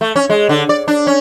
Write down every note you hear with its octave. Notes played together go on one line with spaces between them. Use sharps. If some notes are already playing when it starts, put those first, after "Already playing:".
A3
C#4
G#3
D3
D5
D4
C#4